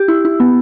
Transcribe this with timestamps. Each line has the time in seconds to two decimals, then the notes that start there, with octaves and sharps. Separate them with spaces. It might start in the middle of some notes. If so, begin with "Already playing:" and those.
Already playing: G4
0.08 E4
0.25 E4
0.40 B3